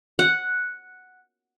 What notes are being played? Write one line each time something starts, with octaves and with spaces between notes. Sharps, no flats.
F#5